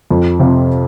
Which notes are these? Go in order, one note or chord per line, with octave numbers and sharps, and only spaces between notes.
F2
C3 F3 C4 F4